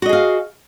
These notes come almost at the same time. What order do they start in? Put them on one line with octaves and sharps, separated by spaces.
F#4 D#5 G#4 F5